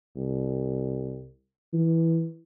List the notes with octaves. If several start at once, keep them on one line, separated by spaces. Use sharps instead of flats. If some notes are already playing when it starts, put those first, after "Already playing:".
C2
E3